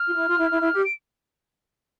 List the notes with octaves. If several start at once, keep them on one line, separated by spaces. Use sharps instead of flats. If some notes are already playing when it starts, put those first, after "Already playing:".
Already playing: F6
F4
E4
F4
E4
E4
E4
G4
D7